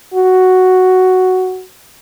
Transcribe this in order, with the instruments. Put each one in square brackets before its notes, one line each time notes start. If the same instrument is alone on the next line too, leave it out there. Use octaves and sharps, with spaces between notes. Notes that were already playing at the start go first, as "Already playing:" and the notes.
[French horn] F#4